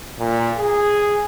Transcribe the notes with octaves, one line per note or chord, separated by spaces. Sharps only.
A#2
G#4